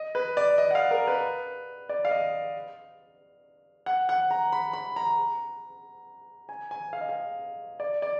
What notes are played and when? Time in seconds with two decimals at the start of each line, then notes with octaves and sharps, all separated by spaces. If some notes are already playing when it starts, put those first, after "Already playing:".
Already playing: D#5
0.15 B4
0.37 D5
0.58 D#5
0.71 F#5
0.75 F5
0.91 A#4
1.07 B4
1.89 D5
2.05 F5
2.11 D#5
3.86 F#5
4.09 F#5
4.31 A#5
4.53 B5
4.73 B5
4.96 A#5
6.49 G#5
6.71 G#5
6.93 F5
7.01 D#5
7.09 F5
7.80 D5
8.02 D5